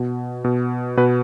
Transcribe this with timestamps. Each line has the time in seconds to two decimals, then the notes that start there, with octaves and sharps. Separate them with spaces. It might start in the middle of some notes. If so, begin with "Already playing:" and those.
Already playing: B2
0.44 B2
0.97 B2 B4